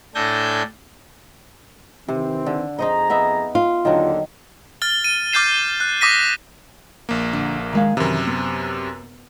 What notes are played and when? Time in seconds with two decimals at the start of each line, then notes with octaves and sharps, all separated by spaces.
0.15 A2 D4 A4 G#5 G6 A#6
2.08 C3 D#3 E3 C4
2.46 D3
2.79 F2 D#4 G#4 C5 D#5 A#5
3.10 B3 D#4 E5
3.55 F4
3.85 D#2 D3 D#3 F#3
4.82 F6 A6 G7
5.04 D#7
5.33 D6 F6 G6 A6 C7 E7
5.80 F#6
6.01 D6 D#6 A#6 B6 D#7
7.09 A#1 A#3
7.33 D3
7.73 D#3 G#3 F5
7.97 F#2 C3 D#3 E3
8.27 B3